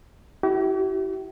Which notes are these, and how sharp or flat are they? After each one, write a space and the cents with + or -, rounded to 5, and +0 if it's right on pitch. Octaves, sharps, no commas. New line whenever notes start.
E4 +0 G4 -45